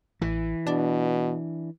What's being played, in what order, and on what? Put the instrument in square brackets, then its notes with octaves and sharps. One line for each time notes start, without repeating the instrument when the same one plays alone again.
[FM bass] A1 [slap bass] E3
[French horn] B2 [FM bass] D4